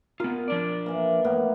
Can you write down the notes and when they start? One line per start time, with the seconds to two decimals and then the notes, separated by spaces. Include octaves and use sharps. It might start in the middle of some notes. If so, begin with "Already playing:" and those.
0.20 B3 F4 A#4
0.48 F3 D4 D5
0.86 E3 A#3
1.24 A2 A#3 B3